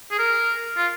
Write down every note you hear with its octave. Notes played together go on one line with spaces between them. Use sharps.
G#4
A#4
F4